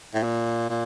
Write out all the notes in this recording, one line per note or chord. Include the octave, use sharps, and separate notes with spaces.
A2
A#2
A#2